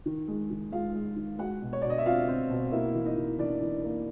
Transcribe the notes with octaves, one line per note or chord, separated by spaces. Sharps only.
D#3
G#3
D#3
G#3 F4 F5
G#3
D#3
G#3 F#4 F#5
B2
C#5
B2 D5
D#5
E5
C4 F4 F5
C4
B2
A#3 E4 E5
E3
D#4 D#5
E3
E3 D4 D5
E3
A#3